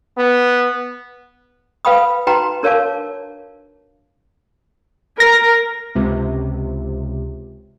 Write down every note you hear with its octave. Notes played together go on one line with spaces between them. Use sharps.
B3
B4 F5 G5 B5 D#6
D#4 F#4 B4 G5 A#5 C6
D4 A#4 C#5 F5 A5 D6
A#4 A#6
C#2 C3